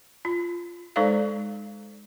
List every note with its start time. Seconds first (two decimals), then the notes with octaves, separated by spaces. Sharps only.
0.25 F4
0.96 G#3 D#4 A4 C5 D5 F5